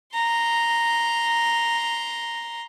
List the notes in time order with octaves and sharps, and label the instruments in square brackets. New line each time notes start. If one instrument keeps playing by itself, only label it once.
[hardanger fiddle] A#5 C6